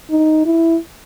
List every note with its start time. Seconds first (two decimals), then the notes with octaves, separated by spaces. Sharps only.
0.10 D#4
0.46 E4